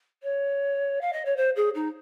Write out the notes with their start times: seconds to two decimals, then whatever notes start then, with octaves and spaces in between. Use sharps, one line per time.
0.23 C#5
1.01 F5
1.13 D#5
1.25 C#5
1.36 C5
1.56 G#4
1.75 D#4